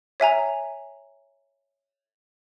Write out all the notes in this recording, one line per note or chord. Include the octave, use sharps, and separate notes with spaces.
C#5 E5 G#5 A#5